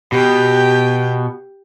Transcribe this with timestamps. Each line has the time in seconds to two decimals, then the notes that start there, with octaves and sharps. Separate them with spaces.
0.12 B2 G4 G5